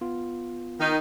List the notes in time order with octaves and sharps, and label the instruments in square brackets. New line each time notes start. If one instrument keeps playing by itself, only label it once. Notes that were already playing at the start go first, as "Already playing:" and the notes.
[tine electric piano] B3 F4
[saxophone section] D#3 D#4